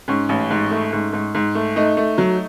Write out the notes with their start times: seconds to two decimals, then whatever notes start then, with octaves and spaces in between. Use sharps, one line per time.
0.08 G#2 C#4
0.29 A1
0.51 G#2
0.71 A3
0.93 G#2
1.13 G#2
1.35 G#2
1.55 A3
1.76 A3 D#4
1.97 A3
2.18 F#3